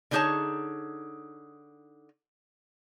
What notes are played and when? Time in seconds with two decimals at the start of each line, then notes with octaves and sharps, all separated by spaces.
0.11 D3 G3 D#4 G#4 C#5 A5